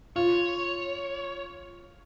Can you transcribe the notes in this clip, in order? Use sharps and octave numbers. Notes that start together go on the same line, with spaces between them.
F4 C#5